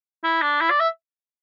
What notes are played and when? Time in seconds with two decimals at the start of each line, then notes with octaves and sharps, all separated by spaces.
0.24 E4
0.42 D4
0.61 E4
0.70 D5
0.80 E5